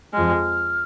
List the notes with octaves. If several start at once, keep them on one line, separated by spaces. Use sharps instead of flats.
F2 F3 G#3 F6